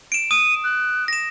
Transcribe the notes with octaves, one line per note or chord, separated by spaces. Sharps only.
D7 E7
D#6 D#7
F#6
A#6 E7